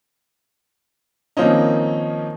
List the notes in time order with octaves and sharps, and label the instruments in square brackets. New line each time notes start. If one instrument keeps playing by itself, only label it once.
[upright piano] D#3 F3 A#3 C4 C#4 D#4